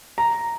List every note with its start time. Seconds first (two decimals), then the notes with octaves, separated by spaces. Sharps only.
0.18 A#5